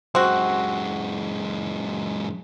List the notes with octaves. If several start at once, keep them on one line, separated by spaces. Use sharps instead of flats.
F#2 G#3 C4 F#4